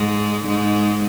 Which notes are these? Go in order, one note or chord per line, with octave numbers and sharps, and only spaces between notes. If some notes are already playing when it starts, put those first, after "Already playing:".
Already playing: G#2 G#3
G#2 G#3